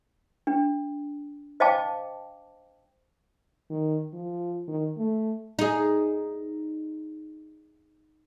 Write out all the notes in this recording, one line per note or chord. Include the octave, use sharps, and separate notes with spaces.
D4
C5 D#5 F5 G5 A5 D6
D#3
F3
D#3
A3
D#4 G#4